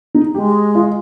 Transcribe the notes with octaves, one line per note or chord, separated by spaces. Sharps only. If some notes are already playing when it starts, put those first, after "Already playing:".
D#4
G#3 G4
F4